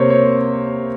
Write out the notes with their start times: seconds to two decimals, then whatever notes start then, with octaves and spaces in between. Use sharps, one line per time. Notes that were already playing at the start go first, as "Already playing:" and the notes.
Already playing: C3 A#3 A#4 C5 C#5
0.10 C#5